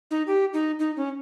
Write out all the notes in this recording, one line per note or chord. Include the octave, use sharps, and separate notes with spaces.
D#4
G4
D#4
D#4
C#4